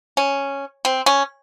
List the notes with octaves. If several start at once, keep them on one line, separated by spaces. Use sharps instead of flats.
C#4
C4
C#4